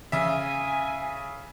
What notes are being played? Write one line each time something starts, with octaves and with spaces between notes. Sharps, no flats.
C#3 E5 G#5